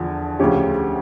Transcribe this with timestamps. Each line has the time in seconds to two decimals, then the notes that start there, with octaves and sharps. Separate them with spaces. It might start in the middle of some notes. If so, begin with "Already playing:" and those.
Already playing: E2 D3 F3
0.39 D2 C#3 F3 C#4 G4